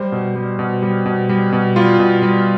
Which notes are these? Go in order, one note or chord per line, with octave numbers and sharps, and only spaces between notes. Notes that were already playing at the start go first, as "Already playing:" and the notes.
Already playing: G3 C5
B2
G3
B2
G3
B2
G3
B2
G3 F4
B2
G3